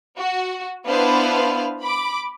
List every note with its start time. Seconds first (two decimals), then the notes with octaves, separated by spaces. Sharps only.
0.18 F#4
0.85 B3 D4 E4 B4 C5 F5
1.81 B5 D6